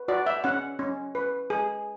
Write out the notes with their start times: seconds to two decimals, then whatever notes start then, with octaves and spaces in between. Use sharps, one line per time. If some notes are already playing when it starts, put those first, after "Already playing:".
Already playing: B4
0.08 F#4 D5
0.26 E5
0.44 C#4 F#5
0.79 C#4
1.15 B4
1.50 G#4